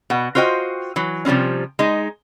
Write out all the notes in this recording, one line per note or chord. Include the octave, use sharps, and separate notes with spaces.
B2 F#5
F4 F#4 C5 D#5 G5
E3 F#3
C3 F3 G3 C4 C#4
G#3 D#4